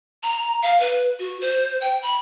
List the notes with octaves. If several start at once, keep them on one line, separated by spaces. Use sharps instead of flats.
A#5
F5
B4
F#4
C5
G5
B5